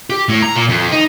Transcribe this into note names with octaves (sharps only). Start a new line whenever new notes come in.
G4
A2
A#5
A#2
F2
D#4